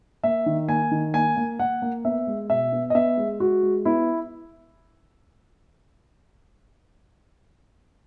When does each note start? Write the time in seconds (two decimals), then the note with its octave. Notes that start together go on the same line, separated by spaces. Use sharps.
0.24 A#3 E5
0.46 D#3
0.68 A#3 G#5
0.91 D#3
1.14 A#3 G#5
1.37 A#3
1.59 A#3 F#5
1.82 A#3
2.05 B3 E5
2.27 G#3
2.50 B2 E5
2.72 B3
2.90 D#5
2.95 B3 E5
3.17 G#3
3.40 G#3 F#4
3.63 G#3
3.85 B3 E4